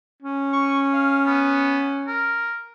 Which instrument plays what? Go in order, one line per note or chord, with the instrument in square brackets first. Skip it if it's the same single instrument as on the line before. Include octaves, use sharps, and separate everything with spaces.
[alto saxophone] C#4
[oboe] C#6
F5
B3
A#4